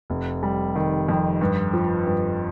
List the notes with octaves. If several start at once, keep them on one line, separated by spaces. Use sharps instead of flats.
F1
G3
D#3
F2
G2
F3
G2